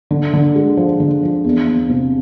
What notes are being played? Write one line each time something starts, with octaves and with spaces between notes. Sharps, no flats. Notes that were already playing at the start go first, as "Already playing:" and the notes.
D3
D3
G#3
F3
D3
F3
E2
E2
C3